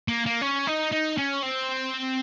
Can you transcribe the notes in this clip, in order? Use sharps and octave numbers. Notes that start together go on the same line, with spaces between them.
A#3
A#3
C#4
D#4
D#4
C#4
C4